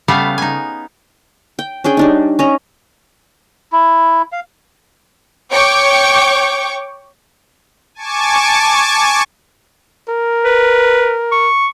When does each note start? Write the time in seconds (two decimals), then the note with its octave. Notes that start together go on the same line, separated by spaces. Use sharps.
0.08 C#3 G3 A3 B3 F5
0.38 D#4 G#5
1.59 G5
1.84 C#4 D4 G#4 G5
1.97 G3 D4 D#4
2.39 C#4 D#5 A#5
3.72 E4
4.32 F5
5.52 C#5 G5 C#6 D6
7.95 G#5 A5 C#6 D6
10.09 A#4
10.45 B4
11.32 C#6